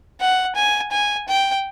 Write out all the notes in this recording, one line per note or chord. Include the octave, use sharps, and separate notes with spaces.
F#5
G#5
G#5
G5